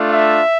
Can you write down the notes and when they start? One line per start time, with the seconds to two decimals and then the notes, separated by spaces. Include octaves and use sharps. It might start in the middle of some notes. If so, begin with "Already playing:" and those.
Already playing: A3 D4 F4
0.11 E5